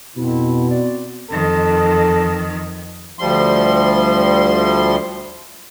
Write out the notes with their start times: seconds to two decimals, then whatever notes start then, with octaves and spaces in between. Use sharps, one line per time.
0.16 F2 B2 C4 E4
0.70 C4 F#4 D5
1.30 F2 D#3 A4
3.19 D2 F3 G3 C6